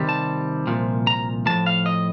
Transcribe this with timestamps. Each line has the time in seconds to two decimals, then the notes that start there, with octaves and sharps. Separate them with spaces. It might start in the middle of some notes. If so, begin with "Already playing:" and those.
Already playing: C3 D#3 G3
0.09 A5
0.67 C2 A#2 F3
1.07 A#5
1.46 A2 F3 A#3 A5
1.66 F5
1.86 D#5